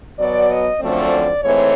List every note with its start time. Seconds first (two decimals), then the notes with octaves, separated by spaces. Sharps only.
0.18 B2 F#3 B3 D5
0.49 D#5
0.80 F#2 D3 F3 A3 C4 D5
1.43 G#2 E3 A3 C4 C#5